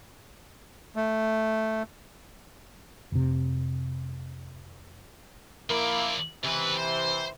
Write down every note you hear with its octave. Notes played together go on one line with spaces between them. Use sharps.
A3
F1 C3
F3 A#3 E4 D5
C#2 C3 E3 B4
C5